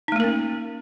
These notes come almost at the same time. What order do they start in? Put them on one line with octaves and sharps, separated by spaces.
D#4 A3 A#3 A#4 C#4